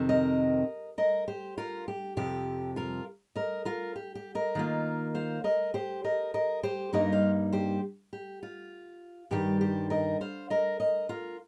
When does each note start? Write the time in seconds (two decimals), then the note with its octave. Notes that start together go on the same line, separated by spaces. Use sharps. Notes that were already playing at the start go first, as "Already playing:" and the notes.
Already playing: F2 C3 D#3 C4
0.09 A#4 D#5
0.98 A#4 D#5
1.28 G4 C5
1.58 F4 A#4
1.88 G4
2.17 F2 C3 F3 G4
2.76 F4 A#4
3.35 A#4 D#5
3.65 F4 A#4
3.96 G4
4.15 G4
4.35 A#4 D#5
4.55 D#3 A#3 F4
5.15 C5 F5
5.44 A#4 D#5
5.74 G4 C5
6.04 A#4 D#5
6.34 A#4 D#5
6.63 G4 C5
6.93 G2 G3 A#3 D#4 A#4 D#5
7.12 C5 F5
7.52 G4 C5
8.13 G4
8.43 F4
9.31 G2 D#3 G3 G4
9.61 G4 C5
9.90 A#4 D#5
10.21 C5 F5
10.50 A#4 D#5
10.80 A#4 D#5
11.09 F4 A#4